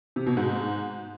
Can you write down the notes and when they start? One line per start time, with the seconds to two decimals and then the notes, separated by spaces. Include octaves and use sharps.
0.16 C3
0.26 B2
0.37 G#2